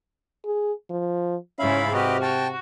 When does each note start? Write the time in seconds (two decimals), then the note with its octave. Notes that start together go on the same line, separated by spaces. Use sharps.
0.45 G#4
0.90 F3
1.59 G#2 C#3 C#4 E4 E5 F5 B5
1.94 C3 F#4 G4 B4 D#5 F6
2.22 F#4 G5 A5